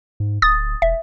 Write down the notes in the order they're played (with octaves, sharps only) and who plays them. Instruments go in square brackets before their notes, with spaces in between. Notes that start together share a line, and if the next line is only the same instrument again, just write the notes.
[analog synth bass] G#2
[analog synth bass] D1 [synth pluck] D#6 A6
[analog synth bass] E1 [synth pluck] E5